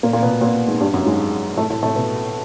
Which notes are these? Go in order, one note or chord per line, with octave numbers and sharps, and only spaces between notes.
A#2 A#3
A#2 A#3
B2 B3
A#2 A#3
G#2 G#3
G2 G3
F#2 F#3
G#2 G#3
A2 A3
A2 A3
A2 A3
B2 B3